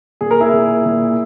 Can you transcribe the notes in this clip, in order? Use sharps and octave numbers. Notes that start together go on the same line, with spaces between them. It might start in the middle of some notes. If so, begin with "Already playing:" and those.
A#2 G#4
A#4
E4 G#4
A#2
A#2